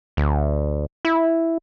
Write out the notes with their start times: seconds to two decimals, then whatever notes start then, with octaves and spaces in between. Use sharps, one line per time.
0.17 D2
1.05 E4